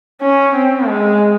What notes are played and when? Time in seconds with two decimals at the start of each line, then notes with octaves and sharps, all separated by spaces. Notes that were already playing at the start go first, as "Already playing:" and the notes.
0.21 C#4
0.55 C4
0.89 G#3